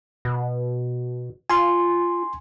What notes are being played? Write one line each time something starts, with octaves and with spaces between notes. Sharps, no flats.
B2
F4 G#5 C6